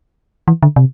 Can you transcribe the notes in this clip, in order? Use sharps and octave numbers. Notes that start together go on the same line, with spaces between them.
E3
D3
C3